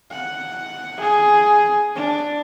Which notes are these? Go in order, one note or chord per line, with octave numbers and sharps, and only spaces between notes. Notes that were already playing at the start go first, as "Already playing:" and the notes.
F#5
G#4
D4